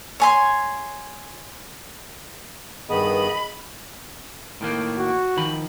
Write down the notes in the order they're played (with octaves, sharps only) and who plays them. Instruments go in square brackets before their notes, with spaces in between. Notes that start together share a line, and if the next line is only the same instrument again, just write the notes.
[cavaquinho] C#5 G#5 C6
[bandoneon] G2 D#3 B3 [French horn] G#4 [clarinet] D#5 [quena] B5
[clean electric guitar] A2 D#3 A#3
[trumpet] F#4
[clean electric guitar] D#3 F3 B5